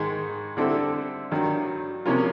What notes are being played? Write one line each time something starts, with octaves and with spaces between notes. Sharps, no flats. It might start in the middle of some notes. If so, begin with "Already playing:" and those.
Already playing: G#2 D#3 G#3
D3 G3 C4 E4 A4
G2 D#3 F#3
C3 F3 A#3 C#4 F4